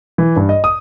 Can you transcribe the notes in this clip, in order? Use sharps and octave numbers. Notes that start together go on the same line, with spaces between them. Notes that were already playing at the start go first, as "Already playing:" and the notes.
E3
G2
D#5
D#6